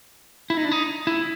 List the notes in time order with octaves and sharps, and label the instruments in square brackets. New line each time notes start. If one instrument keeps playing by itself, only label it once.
[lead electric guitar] E4
D#4
D4
D#4
E4